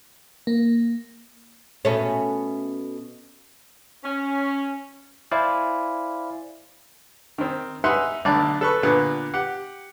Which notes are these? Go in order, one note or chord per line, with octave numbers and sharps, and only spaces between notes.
A#3
B2 A3 C#4
C#4
E4 C5 D5 F5 G#5
D#3 C4
D#4 B4 E5 F#5 G#5 C6
B1 D3 A3 D5 A5
A4 B4 C#6
A#2 D3 B3
G4 F#5